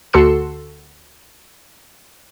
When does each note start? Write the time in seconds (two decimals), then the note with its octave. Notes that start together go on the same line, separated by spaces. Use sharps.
0.13 D2 F#4 A4 C6 E6 C#7